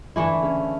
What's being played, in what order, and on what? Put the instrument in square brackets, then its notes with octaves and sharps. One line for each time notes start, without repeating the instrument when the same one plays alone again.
[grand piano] D3 D4 [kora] E3 A3 E4
[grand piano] C#3 C#4